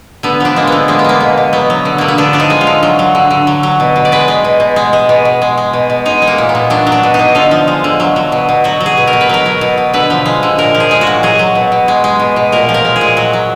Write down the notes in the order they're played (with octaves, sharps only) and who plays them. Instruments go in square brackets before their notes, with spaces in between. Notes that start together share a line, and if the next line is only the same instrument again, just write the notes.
[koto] D3 B3
F3 D4
G#3 A#3
D3 B3
G#3 A#3
B3
G#3 A#3
B2
B2
F#3 B3
F#3
D3
D3 A#3
B3
D3 D4
F3 D4
D#4
G#3
F4
D3
F#3
F#3
D3
D3
F#3
F#3
B2
B2
D5
G#3 B4
G#3
B2
B2
G#3
G#3
B2
B2
G#3
G#3
B2
B2
G#3 D#4
G#3
A#3
A#2
B3
A#2
F#3 D4
F#3
D4
B2
D#4
B2
D3 F4
F3
G#3
D3
F#3
F#3
B2
B2
F#3 F#4
F#3
G#4
B2
A#4
B2
B4
F#3 A#4
F#3
B2
B2
D3 B4
F3
G#3
D3
A#2 A#4
F3
G#4
G#3
F#4
A#2
F#3 G#4
F#3
B2
B2
G#3
G#3
B2
B2
A#2 A#4
F3
A#4
G#3
G#4
A#2
F#3 F#4
F#3